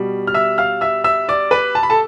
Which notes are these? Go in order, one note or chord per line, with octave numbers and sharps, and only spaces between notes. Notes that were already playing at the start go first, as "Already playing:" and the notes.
Already playing: B2 G3
F6
E5 E6
F5 F6
E5 E6
E5 E6
D5 D6
B4 B5
A5
B5
A4 A5